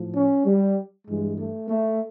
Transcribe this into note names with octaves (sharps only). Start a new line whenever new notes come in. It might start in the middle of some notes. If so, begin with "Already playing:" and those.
Already playing: A2 F3
C#4
G3
G2 E3 G#3
A3
A3